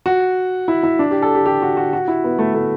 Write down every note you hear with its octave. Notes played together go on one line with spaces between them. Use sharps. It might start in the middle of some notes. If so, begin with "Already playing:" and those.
F#4
E4
E4
D4
G4
A4
G4
G4
F#4
F#4
F#4
E4
B3
A3
A3